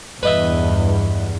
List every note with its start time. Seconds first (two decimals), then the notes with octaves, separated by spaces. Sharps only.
0.23 E2 G2 B4 D#5 E5